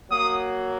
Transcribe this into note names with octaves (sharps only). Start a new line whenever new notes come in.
F#3 A#3 D#6